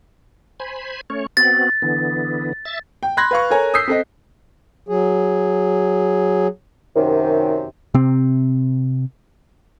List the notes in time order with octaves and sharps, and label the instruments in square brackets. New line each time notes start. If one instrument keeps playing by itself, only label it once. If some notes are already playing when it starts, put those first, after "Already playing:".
[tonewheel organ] C5 G#5 B5
A3 C#4 C#5
[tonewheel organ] B3 C4 F#4 [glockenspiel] A6
[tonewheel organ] D3 E3 B3
E5 A6
[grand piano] G5
B5 C6 F#6 G#6 A#6
B4 F5 C#6
A4 A#4 C#5 G#5 A#5
D#6 E6 G6 B6 C7
C4 A4 D#5
[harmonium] F#3 G#4
[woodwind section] F#2 C3 D#3
[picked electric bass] C3 C4